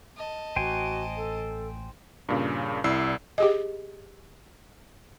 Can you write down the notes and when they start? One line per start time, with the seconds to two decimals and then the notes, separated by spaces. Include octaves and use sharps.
0.16 D#5 A5
0.56 A1 F#4 C5 G5 G#5
1.16 A4
2.29 G2 A#2 C#3
2.84 C2 E4 D5 E6 C7
3.38 G4 G#4 D#5